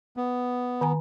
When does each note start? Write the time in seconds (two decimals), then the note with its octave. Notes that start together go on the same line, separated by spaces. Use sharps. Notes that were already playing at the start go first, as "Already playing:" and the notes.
0.17 B3
0.81 D#3 G#5 A#5